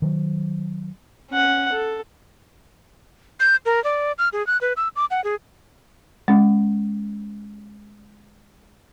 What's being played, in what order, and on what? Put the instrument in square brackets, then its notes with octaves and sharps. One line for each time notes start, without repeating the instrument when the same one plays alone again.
[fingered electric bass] D#3 F#3
[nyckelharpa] C#4 F#5
A4
[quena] G6
A#4
D5
F6
G#4
F#6
B4
E6
D6
F#5
G#4
[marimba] G#3 C#4